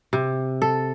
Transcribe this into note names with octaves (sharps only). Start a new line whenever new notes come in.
C3
A4